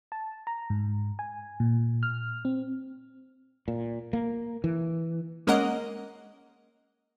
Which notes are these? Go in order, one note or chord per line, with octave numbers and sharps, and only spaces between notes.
A5
A#5
G#2
G#5
A#2
F6
C4
A#2
A#3
E3
G#3 A#3 C#4 A#4 D#5 F#5